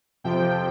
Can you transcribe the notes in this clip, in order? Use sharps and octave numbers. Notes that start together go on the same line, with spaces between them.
F2 C3 F3 G5